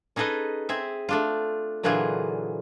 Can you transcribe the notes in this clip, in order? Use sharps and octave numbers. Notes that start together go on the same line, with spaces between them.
C#4 D#4 G#4 A4 B4 D#5
C4 G#4 E5
A3 D4 F4
A#2 D3 E3 F#3 F4 G#4